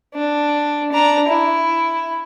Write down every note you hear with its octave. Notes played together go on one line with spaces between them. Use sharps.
D4
D4 A#5
E4